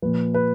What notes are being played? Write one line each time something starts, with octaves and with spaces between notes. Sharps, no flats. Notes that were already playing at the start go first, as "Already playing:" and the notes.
A#2 F3 B4
B4